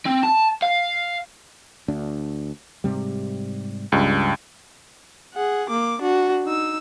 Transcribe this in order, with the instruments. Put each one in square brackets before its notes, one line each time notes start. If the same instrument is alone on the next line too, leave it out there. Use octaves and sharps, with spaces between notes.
[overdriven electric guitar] C4
A5
F5
[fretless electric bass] D2 D4
G#2 C3 G3
[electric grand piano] C#2 G2
[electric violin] G#4 F#5
A#3 D6
D4 F#4
D#4 E6